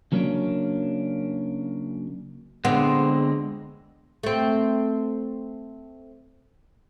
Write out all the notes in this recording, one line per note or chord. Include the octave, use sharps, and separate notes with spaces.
C#3 F#3 A#3 B3 C#4 D4
D3 G#3 B3 C4
A3 C4